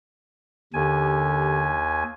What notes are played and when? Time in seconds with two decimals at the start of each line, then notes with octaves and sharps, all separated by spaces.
0.74 D#2 D3 D4 G4 G#5